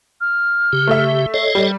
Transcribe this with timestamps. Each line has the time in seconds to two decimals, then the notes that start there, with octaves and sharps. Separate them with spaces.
0.21 F6
0.73 C#3 G4
0.87 A3 E5
1.34 A4 C#5 D#5 C7
1.55 G3